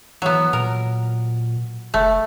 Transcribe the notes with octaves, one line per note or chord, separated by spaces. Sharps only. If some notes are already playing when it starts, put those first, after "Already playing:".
E3 F#3 B3
A#2 A#4
F1 A3